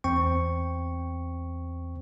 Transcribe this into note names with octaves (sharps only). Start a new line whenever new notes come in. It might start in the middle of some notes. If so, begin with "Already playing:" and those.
E2 C4 G5 C#6